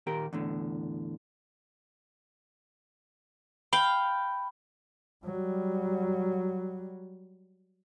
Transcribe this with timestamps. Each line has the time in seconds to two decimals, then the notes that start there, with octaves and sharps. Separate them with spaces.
0.07 D#2 A#2 G4 A#4
0.33 E2 A2 D3
3.73 F5 G5 B5
5.25 F#3 G3